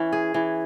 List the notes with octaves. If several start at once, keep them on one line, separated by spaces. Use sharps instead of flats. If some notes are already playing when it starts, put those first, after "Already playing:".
Already playing: E3 C#4
G#4
E3